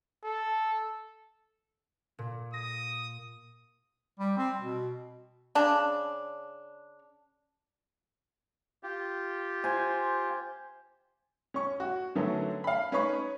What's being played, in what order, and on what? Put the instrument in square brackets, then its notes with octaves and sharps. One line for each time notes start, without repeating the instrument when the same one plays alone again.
[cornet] A4
[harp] A#2
[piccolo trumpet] D#6 [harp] A#6
[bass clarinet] G3
C4
B2
[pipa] C#3 D4
[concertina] F4 G4
[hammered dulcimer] C5 G#5
[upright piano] C#4 C#6
F#4
D3 D#3 F#3 A3 B3 C#4
F5 B5
C#4 D#4 B4 C#5 B5 C#6